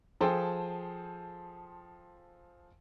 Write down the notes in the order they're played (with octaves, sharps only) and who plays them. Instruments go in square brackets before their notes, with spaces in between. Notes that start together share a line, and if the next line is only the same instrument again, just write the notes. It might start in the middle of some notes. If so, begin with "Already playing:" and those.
[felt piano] F3 G#4 A4 C5 G5 A5